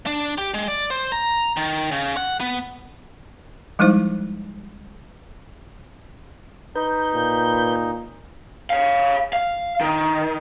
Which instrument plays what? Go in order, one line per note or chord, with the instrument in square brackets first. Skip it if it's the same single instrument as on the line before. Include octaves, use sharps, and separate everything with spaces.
[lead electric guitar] D4
G4
G#3
D5
C5
A#5
D#3
C#3
F#5
B3
[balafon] F3 G3 G#3 D#4 E4 C5
[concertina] D#4 [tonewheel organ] B4 G6
[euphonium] A#2
[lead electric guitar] C#5 F5
F5
D#3